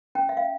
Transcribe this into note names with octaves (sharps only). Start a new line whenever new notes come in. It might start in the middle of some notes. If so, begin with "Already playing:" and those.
C#4 G5
E5
F5